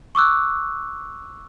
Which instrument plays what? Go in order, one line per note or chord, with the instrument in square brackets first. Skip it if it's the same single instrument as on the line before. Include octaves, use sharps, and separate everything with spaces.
[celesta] C#6 D6 E6 F#6